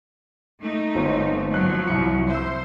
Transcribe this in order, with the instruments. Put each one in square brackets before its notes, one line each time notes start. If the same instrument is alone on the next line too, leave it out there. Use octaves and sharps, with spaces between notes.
[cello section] A3 D#4
[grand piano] G1 C4 C#5
[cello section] F3 F#3 [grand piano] F#6
[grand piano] C2 C#7
[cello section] C5 [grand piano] E5 E6